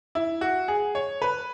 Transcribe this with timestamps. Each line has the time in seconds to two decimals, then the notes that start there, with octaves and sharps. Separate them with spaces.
0.15 E4
0.41 F#4
0.68 G#4
0.95 C#5
1.22 B4